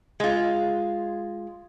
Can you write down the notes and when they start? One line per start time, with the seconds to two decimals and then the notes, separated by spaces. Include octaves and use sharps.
0.20 G#3 F4